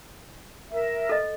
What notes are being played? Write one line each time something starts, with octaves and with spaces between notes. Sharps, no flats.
A#4 E5
A4 D#5